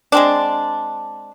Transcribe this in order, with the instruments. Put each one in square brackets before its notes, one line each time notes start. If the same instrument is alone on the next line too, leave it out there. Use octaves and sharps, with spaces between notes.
[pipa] G#3 C4 D4